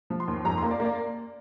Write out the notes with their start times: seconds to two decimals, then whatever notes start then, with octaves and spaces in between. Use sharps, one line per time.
0.10 F3
0.20 C6
0.28 D#2
0.45 F2 A#5
0.58 A#3 C6
0.71 D5
0.80 A#3
0.85 D5